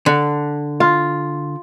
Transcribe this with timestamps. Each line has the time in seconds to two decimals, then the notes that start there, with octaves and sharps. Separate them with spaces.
0.06 D3
0.80 F4